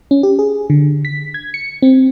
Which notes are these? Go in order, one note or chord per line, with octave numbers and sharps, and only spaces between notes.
C#4
G4
G#4
D3
B6
G#6
C#7
C4